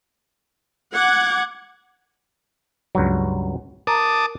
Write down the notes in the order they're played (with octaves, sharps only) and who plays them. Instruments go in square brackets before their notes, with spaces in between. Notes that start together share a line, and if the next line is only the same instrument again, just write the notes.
[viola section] F#5 [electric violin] D6 G#6
[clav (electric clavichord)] C#2 G2 F#3
[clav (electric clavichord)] A#4 [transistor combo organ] A5 D6 D#6